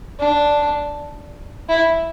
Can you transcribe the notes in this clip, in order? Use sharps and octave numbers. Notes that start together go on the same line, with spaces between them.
D4
E4